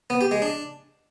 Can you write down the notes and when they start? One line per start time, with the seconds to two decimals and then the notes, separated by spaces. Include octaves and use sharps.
0.10 B3
0.21 G4
0.31 G#3
0.42 D4